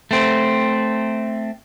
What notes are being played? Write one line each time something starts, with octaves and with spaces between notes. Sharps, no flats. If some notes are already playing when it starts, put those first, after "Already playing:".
A3 C4